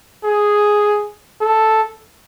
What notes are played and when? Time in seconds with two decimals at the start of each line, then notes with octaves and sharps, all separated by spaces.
0.24 G#4
1.41 A4